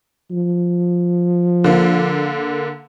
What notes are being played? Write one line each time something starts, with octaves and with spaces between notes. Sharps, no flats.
F3
D3 A#3